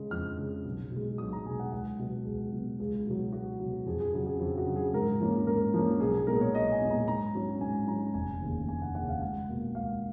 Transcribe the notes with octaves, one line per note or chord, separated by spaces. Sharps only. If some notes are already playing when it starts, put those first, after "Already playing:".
Already playing: C#3 G#3
F2 F6
C#3 G#3
B1
B2 G#3
B1 D#6
A#5
B2 G#3 G#5
F#5
C#2 F#5
B2 F#3 B3
C#2 G#4
B2 F#3 B3
C#2 G#4
B2 F#3
C#2 F#4
B2 F#3
F2 G#4
G#4
C#3 F#3 F#4
G#4
F2 G#4
F#4
C#3 F#3
G#4
G#2 A#4
F3 A#3 C#4
G#2 A#4
F3 A#3 C#4
B1 G#4
G#4
A#2 G#3 B3 A#4
C#5
B1 D#5
G#5
A#2 G#3 B3
A#5
G#2 A#5
F#3 C#4
G#2 G#5
F#3 C#4 A#5
F1 G#5
D#2 C#3
F1 G#5
F#5
D#2 C#3 F#5
F5
C#2 F#5
B2 A#3
C#2 F5